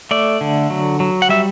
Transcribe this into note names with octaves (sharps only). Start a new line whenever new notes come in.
A3 D5
D3
F#3
F#3
F#5
G3 E5